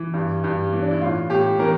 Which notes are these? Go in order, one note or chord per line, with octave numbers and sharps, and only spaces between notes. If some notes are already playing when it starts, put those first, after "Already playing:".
Already playing: E3
G2
G2
E3
D4
E4
A2 F4
A2 G4
E3 A#4